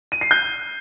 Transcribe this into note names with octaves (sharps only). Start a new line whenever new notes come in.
D#7
C7
G6